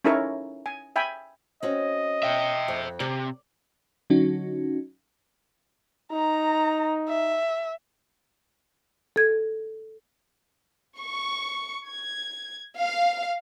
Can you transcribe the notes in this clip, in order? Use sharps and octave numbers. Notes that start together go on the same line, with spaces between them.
C#4 D#4 E4 A4 A#4 C#5
G#5
E5 G5 G#5 B5
C4 C#4 F#4 D#5
E5 G5
F2
C3 D5
D3 F#3 C#4 D#4 F#4
D#4 A#5
E5
A4 G#6
C#6
G#6
F5